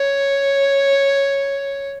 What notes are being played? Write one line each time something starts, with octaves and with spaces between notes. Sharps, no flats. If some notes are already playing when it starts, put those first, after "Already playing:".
Already playing: C#5